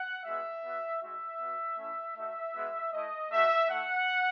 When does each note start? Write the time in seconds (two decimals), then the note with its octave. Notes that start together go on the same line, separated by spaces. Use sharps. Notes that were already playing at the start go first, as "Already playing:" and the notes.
Already playing: F#5
0.24 G#3 B3 F#4 E5
0.63 B3 F#4
1.00 G#3 D#4 F#4 E5
1.39 B3
1.44 F#4
1.77 A3 C#4 E4
2.16 A3 D#4 F#4 E5
2.54 G#3 B3 F#4
2.93 A3 E4 D#5
3.31 A3 D#4 F#4 E5
3.69 A3 E4 F#5